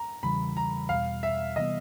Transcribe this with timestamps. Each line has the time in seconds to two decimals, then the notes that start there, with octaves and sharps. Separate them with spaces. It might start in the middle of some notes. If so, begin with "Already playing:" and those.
Already playing: A#5
0.23 E2 C#3 E3 G3 B5
0.57 A#5
0.89 E2 B2 G3 F5
1.23 E5
1.56 C3 E3 G3 B3 D#5